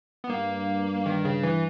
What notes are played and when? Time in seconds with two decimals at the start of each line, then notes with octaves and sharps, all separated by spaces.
0.24 B3
0.29 G2 A#3
1.06 D#3
1.25 C#3
1.44 E3